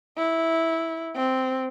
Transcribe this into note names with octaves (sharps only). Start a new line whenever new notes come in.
E4
C4